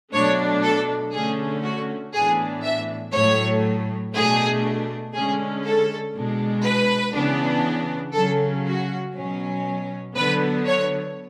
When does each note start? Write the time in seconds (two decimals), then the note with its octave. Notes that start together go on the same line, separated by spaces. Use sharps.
0.12 B2 F#3 A3 D4 C#5
0.63 A4
1.13 D3 A3 C#4 G#4
1.63 F#4
2.13 A2 E3 B3 D4 G#4
2.64 E5
3.13 A2 F#3 A3 C#5
4.14 B2 A3 D4 G#4
5.14 D3 G#3 C#4 G#4
5.65 A4
6.15 B2 G#3 D4
6.65 B4
7.15 C#3 E3 B3 D4
8.15 C#3 F#3 C#4 A4
8.66 F#4
9.15 B2 F#3 C#4
10.15 D3 F#3 B3 B4
10.66 C#5